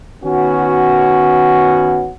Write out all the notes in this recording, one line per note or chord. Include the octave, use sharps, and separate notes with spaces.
D#3 B3 C#4 F#4